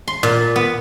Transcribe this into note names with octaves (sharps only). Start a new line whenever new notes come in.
C6
A#2
B3